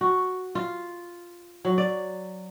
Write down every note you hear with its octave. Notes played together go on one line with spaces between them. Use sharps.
F#4
F4
F#3
D5